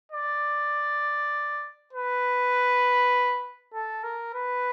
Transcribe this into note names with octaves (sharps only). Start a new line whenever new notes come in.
D5
B4
A4
A#4
B4